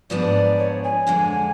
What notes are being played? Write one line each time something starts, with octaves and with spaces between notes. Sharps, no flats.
G#2 F3 B3 D4 G#4 D5
C#5
G#5
F2 D3 G#3